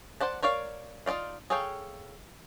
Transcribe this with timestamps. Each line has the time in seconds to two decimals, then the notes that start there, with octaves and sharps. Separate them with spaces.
0.21 C5 D5 F#5 A5
0.43 A#4 C#5 D5 F5
1.06 D#4 F4 G#4 D5 F5
1.50 G#4 A4 C#5 F5 G5